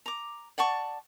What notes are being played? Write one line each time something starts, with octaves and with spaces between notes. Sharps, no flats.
A#5 D6
D5 F#5 A5 C#6